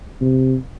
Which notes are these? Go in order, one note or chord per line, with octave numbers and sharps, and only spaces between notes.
C3